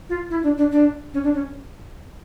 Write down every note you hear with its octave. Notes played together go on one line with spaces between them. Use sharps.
F4
E4
D4
D4
D4
C#4
D4
C#4